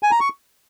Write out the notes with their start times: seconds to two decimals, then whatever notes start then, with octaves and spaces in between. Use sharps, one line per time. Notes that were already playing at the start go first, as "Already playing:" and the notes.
0.03 G#5
0.11 A#5
0.20 C#6